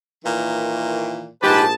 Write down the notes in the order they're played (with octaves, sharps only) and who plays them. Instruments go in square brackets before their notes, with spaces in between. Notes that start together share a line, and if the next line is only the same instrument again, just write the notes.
[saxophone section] A#2 D#3 E3
[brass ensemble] A#1 G#4 A5 [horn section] G#2 G4 B4